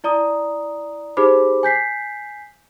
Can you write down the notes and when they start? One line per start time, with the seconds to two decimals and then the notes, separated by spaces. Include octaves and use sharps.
0.04 E4 D5 A#5 D#6
1.17 D#4 G4 G#4 C5 B5 D6
1.63 G#5 G6 B6 C7